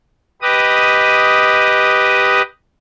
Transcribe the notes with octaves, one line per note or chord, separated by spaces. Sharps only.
G4 B4 D#5 D#6